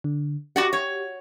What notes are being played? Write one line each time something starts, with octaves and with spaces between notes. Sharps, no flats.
D3
F#4 G4 D5 F#5
C#5